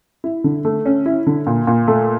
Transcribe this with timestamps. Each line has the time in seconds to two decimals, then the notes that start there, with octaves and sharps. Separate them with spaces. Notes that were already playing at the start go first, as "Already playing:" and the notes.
0.24 E4
0.44 D3
0.65 A3
0.86 C#4
1.06 E4
1.27 D3
1.47 A#2
1.67 A#2
1.88 A3